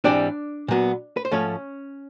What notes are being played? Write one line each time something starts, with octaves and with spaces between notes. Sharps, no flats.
G#2 E3 G3 C4 D4 D5
A#2 F#3 B3
B4
C5
G#2 F3 A3 C#4 C#5